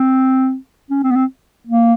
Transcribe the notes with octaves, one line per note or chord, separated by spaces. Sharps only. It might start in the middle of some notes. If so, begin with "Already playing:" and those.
Already playing: C4
C#4
C4
B3
C4
A#3